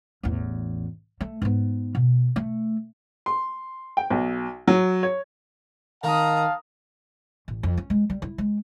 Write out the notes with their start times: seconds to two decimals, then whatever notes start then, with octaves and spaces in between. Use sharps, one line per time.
0.23 A1 E2
1.21 A3
1.42 G#2 B3
1.95 B2
2.36 A3
3.26 C6
3.97 G5
4.10 B1
4.68 F#3
5.03 C#5
6.04 D#3 F5 A5 A#5 D#6
7.48 A1
7.63 F2
7.77 C#4
7.90 G#3
8.10 G3
8.22 E4
8.38 G#3